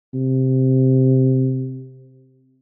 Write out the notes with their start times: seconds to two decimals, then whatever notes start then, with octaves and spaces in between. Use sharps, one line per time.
0.14 C3